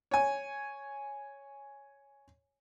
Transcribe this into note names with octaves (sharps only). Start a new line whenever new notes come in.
C#5 G#5